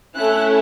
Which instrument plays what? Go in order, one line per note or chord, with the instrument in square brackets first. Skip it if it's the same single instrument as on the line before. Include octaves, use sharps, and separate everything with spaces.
[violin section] A3 C#4 E4 F#6